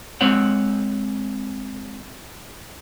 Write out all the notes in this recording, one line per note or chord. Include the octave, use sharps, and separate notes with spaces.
G#3 C4 C5 C#5 F#5